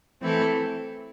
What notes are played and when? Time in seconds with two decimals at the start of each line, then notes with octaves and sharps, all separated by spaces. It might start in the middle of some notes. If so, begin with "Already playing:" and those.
0.21 E3 A3 C4 E4 A4